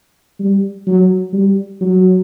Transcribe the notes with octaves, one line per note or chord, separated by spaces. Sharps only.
G3
F#3
G3
F#3